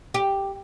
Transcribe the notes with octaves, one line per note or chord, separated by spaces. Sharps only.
G4